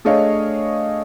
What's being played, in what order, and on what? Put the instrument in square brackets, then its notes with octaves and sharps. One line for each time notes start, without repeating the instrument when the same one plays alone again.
[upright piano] A3 D4 G#4 C#5 D#5 F5